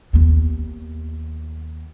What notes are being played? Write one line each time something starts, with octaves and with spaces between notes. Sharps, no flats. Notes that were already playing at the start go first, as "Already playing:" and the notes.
D#2 B3